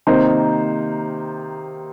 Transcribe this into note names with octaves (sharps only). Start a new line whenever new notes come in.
C3 D#3 A#3 D#4 C5